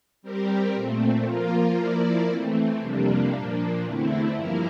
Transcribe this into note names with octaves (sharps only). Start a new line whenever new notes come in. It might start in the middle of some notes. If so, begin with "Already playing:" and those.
G3 C4 G4 A#4
A#2 A3 C4
F3 A#3 F4 A#4
F3 A#3 E4 A#4 D5
E3 A3 C4
F2 C3 G3 A#3 D4
A#2 F3 A#3 D4
E2 D3 A3 C4 E4
G2 F3 A#3 E4 A#4